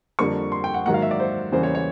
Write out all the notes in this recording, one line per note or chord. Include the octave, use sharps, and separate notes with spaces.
F2 D3 G3 A#3 C#6
C6
G5
F#5
G#2 D#3 F#3 A#3 F#5
F5
E5
D5
C5
E2 C#3 E3 G3 A#3 C5
C#5
C#5